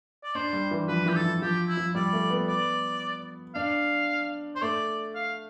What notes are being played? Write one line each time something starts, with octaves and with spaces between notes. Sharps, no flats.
D5
D4 C5
G3
E3
F3 B4
E3 G4
A4
E3
F3 G4
E4
F3
G3 D5
A3
B3
D5
D4 F5
C5
A3 D5
F5